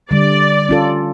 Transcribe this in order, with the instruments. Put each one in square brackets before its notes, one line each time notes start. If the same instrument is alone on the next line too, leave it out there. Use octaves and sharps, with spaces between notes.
[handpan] D3 G3 [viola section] D5
[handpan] C#4 F4 A4